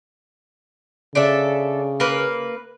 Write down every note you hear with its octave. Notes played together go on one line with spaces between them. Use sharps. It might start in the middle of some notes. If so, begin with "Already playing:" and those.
C#3 D4 A4 E5
A#3 B4